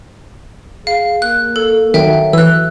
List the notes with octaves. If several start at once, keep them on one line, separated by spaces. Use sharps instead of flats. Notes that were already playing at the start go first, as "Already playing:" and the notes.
G#4 F5
A#3 F#6
A4
D#3 F#3 E5 G5
E3 E6 F#6